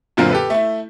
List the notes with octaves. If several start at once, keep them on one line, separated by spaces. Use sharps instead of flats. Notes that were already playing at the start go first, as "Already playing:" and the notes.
F#2 A#2 D3 C4 F4 A#4
G4 A4 B4
A3 E4